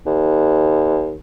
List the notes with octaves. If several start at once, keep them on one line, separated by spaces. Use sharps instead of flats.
D#2